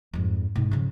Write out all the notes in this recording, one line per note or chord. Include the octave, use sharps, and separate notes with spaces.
F2 G#2
G#2 B2
C#3 F3